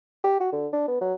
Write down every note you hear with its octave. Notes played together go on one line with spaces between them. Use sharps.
G4
F#4
D3
D4
B3
F#3